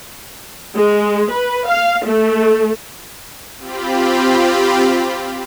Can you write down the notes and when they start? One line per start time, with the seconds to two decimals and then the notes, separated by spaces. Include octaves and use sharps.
0.75 G#3
1.30 B4
1.67 F5
2.03 A3
3.59 C4 F4 G4 B5